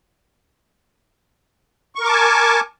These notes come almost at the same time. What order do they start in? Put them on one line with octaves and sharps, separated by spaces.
C#6 A#4 D6 A5 G#5